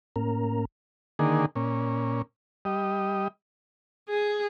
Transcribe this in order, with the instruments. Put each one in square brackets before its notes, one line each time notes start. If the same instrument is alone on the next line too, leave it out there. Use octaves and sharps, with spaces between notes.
[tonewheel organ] A2 A#3 C#4 A#4 A#5
[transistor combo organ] D3 D#3 A#3 G#4
A#2 C#4
G3 D#5
[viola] G#4